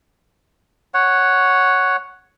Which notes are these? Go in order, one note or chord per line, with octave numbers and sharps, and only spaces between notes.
C#5 F#5